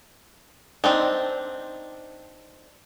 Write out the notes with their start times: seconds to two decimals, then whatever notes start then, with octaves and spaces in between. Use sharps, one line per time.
0.84 C4 D4 D#4